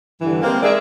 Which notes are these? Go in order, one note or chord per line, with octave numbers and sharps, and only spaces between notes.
G2 D3 E3
G#3 A#3 C4
G#3 D#4 E4 G#4 D5 E5